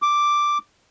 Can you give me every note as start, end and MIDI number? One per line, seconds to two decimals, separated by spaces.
0.02 0.58 86